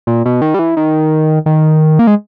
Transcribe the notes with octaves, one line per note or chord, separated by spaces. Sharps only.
A#2
B2
D#3
G3
E3
D#3
D#3
A#3
G#3